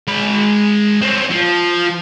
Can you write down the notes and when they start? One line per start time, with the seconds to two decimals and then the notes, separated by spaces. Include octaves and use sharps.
0.08 G#3 B5
1.02 C4 C#4
1.31 F3